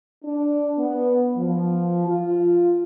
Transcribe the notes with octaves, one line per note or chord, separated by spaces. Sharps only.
D4
B3
F3
F4